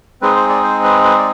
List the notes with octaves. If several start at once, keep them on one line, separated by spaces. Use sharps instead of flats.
G#3 C4 D#4 G#4 B4
C5
D5
C5
B4
B4
D5